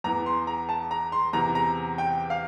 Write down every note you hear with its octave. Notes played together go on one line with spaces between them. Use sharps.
E2 E3 A#5
C6
A#5
A5
A#5
C6
E2 C3 E3 A#5
A#5
G5
F5